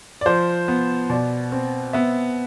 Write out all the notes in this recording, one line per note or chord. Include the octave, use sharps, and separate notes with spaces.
D5
F3 C5
B3
B2 D5
C4
B3 E5